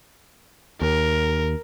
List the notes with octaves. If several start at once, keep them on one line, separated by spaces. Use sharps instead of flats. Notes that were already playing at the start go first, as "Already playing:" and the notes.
D#2 A#4